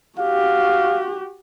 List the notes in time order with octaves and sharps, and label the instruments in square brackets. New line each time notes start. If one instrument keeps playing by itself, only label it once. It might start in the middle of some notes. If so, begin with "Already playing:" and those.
[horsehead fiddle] F#4 G4 [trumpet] F5